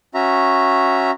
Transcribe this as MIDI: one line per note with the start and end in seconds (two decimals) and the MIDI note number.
0.14 1.11 61
0.14 1.11 66
0.14 1.11 76
0.14 1.11 82